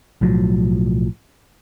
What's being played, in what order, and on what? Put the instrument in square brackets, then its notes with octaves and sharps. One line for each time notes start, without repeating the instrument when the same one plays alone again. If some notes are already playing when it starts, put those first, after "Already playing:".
[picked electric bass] B1 A2 F3 F#3